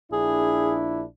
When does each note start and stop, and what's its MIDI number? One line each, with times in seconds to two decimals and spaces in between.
0.12 1.05 34
0.12 1.05 62
0.12 1.05 64
0.12 0.75 68